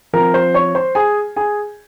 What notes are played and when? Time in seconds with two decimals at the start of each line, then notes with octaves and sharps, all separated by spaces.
0.13 F3 C4 A#4 A#5
0.34 C5 C6
0.54 C#5 C#6
0.75 C5 C6
0.95 G#4 G#5
1.36 G#4 G#5